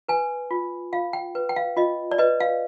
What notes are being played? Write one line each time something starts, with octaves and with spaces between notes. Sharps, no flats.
B4 G#5
F4
F4 F5
G5
B4
G5
F5
F4 D#5
D5
B4 D#5
F5